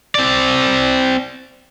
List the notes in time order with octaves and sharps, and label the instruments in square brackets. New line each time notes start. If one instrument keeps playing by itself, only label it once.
[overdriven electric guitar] C4 D5